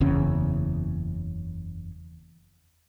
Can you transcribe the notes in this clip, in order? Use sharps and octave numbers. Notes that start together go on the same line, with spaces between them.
F#1 E2 C#3 C#4